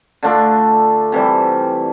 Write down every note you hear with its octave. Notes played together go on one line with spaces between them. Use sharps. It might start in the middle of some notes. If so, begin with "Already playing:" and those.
D3 A3 D4 F4
C3 E3 G3